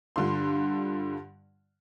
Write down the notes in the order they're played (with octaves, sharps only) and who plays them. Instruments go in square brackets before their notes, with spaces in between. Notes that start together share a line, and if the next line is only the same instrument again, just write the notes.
[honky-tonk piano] G2 D3 F4 C6